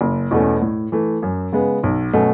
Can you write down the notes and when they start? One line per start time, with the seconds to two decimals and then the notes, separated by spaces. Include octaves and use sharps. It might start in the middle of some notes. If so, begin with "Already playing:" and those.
0.01 F#1
0.31 E2 B2 A3 C#4
0.62 A2
0.92 E3 A3
1.23 F#2
1.53 C#3 G#3 B3
1.83 B1
2.13 B2 F#3 A3 C#4